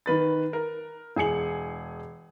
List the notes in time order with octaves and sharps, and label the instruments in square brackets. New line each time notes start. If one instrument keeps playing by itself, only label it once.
[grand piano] D#3 B4 A6
A#4
E1 G#4 G#5 C#7 F#7